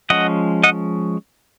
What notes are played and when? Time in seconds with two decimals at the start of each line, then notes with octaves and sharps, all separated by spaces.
0.10 F3 G#3 C#4 D#5 F#5
0.63 D#5 F#5